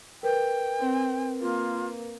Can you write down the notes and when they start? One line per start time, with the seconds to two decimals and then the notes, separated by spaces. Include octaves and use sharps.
0.23 A#4 B4 G5
0.80 C4
1.41 A#3 F4